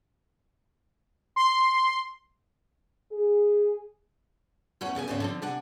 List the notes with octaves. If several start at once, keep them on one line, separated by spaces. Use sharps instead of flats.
C6
G#4
E2 A2 C#4 C#5 F#5
F#2 C#3 G#4 G#5
D2 G#2 C#3 C4 C#5
D3 F3 C4
C3 D4 F#5 G#5